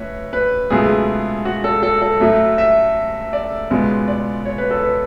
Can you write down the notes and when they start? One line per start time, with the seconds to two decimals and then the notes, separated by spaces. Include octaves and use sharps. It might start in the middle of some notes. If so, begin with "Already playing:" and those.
Already playing: A2 B4 C#5
0.33 B4
0.70 C#2 B2 F#3 A3 G#4
1.45 F#4
1.64 A4
1.83 A4
2.02 A4
2.20 A2 F#3 A3
2.58 E5
3.33 D5
3.70 C#2 B2 G#3
4.08 D5
4.45 C#5
4.58 B4
4.71 A4
4.83 B4